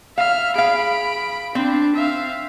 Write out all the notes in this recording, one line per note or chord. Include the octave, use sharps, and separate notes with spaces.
E5 F5 F6
G#4 F5 B5 D7
C4 D4
E5 F5